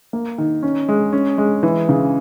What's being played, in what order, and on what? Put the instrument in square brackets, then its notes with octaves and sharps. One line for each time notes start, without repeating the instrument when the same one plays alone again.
[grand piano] A#3
D#3
C#4
G#3
C#4
G#3
E3
C#3